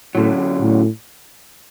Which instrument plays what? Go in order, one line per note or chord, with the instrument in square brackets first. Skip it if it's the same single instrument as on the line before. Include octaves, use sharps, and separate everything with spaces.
[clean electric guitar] F#2 D3 F#3 [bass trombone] A2
[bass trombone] A2